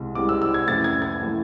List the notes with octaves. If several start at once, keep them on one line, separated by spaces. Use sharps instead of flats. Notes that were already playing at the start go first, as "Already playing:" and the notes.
Already playing: C2 C3 G#3
C2 C3 G#3 D6
E6
E6
G#6
F2 E3 A3 A6
G#6
G#6
E3 A3